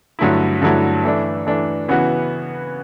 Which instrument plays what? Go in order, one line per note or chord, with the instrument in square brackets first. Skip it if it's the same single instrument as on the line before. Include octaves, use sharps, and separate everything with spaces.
[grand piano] G2 D3 F#3 A3 E4
G2 D3 F#3 A3 E4
E3 A3 D4
E3 A3 D4
C#3 E3 B3 F#4